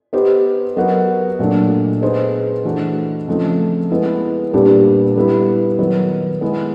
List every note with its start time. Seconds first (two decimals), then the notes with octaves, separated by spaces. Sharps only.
0.13 B3 D#4 G4 C5
0.76 F#3 B3 D#4 F#4 A#4
1.39 A#2 F#3 A3 D4
2.02 B3 D#4 G#4 C5
2.65 E3 A3 D4 F#4
3.28 C#3 F3 A3 C4 D#4
3.91 G#3 B3 E4
4.53 A#2 G3 B3 D4 G4
5.16 G3 B3 E4
5.79 D#3 F#3 B3
6.41 G#3 B3 E4